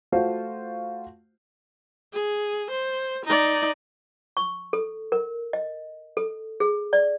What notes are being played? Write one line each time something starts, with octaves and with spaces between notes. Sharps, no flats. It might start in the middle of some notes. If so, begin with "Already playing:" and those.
A3 F4 F#4 C5
G#4
C5
D#4 D5
C#6
A4
A#4
D#5
A4
G#4
D5